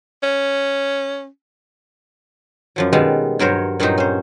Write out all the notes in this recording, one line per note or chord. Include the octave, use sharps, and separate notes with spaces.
C#4
F#2 F3 F#3
B2 D#3 G3 G#3 B3
G2 F#3 A#4 C5 C#5
G2 A#2 F#3 C4 D#4 C5
C#4 C5